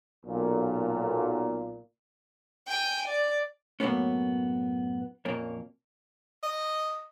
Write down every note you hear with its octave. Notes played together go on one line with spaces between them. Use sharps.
B1 A#2
G5 G#5
D5
F#2 A2 A#3 B3 C#4
F2 A#2 A#3 C#4
D#5